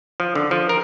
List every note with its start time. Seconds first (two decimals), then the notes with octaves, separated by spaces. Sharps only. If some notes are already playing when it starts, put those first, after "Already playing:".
0.20 F3
0.35 D3
0.51 F3
0.69 A#4